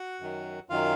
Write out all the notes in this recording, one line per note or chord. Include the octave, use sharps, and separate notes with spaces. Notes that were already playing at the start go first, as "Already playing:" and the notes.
Already playing: F#4 F#5
F#2 D#3 F#3
F#2 D#3 F#3 F4 F5